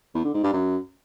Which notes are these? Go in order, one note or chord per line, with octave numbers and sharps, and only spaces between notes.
E2
D3
G#2
G2
F#2